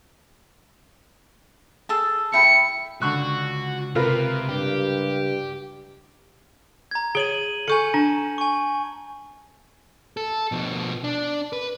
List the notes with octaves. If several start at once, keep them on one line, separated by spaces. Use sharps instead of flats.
G#4 A4 A5
E4 G5 B5 C#7
C#2 D3 F#4 C#6 F#6
C3 F4 A#4 B4
G2 G4
A#5 G#6
G#4 C#5 D#7 F#7 G7
A4 G#5 C#6 G6 C#7
D4 A5
G#5 C#6
A4
B2 F3
D4
B4